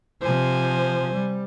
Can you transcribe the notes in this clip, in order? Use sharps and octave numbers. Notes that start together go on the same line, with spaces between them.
C3 F3 C5 G#5
G3